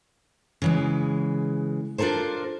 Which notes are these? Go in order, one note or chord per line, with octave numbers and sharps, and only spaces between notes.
C#3 E3 G#3
D4 F4 A4 A#4 C5